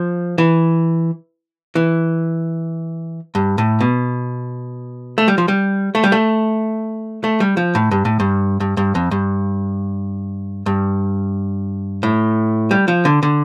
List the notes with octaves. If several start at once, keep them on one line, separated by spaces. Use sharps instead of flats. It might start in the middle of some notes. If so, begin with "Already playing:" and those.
Already playing: F3
E3
E3
G2
A2
B2
A3
G3
F3
G3
A3
G3
A3
A3
G3
F3
A2
G2
A2
G2
G2
G2
F2
G2
G2
A2
G3
F3
D3
D3